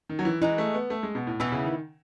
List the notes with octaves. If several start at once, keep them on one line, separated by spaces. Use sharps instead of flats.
D#3
F#3
E3
E3 G#3 D#4 F#4
A3
B3
A3
G#3
B2
A2
B2 E3 B3 E4
C#3
D#3